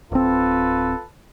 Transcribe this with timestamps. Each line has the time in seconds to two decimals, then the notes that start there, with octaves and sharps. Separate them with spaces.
0.12 D1 C4 F4 A4 B4